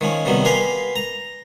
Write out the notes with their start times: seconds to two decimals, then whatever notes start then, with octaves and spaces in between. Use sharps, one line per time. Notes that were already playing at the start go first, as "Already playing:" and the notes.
0.01 D#3 F3 C#4
0.25 C3 D#3 F#3 G3 B3
0.45 G4 A#4 B4 F5 G#5 C6
0.96 A#5